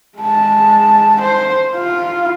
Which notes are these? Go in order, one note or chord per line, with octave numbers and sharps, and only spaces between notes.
G#3 A5
C5
F4